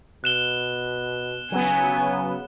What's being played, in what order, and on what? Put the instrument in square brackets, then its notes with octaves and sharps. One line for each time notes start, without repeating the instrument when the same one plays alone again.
[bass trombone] B2 [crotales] F#6 E7 G7
[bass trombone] C#3 [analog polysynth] F#3 B3 [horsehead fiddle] G#5